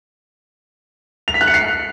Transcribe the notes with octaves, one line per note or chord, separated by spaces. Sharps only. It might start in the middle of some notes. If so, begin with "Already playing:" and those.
F7
B6
F#6
C#7
C7